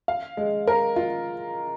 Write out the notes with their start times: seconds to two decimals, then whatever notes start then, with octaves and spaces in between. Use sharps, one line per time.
0.08 F5
0.37 G#3
0.67 A#4
0.96 F4